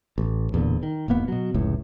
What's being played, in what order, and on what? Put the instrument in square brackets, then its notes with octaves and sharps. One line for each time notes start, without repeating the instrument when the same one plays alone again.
[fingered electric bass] A1
D1 E2 A#2 D3
D#3
E1 G#2 A#3 B3
B2 F#3
F1 C#2 A2